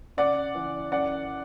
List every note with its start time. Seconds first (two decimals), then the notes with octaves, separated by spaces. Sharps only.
0.17 C#3 D5 F#5
0.55 E3
0.92 F#2 D5 F#5